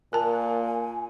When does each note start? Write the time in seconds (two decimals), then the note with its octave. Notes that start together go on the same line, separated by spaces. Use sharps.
0.13 A#2 A#4 G#5 A5